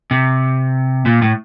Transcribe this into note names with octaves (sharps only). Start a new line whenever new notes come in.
C3
A#2
A2